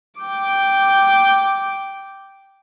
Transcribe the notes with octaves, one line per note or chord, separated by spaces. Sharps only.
G5 D6